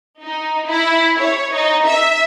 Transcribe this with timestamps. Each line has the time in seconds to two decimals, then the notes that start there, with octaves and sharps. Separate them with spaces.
0.22 D#4
0.66 E4
1.20 C#5
1.53 D#4
1.85 E5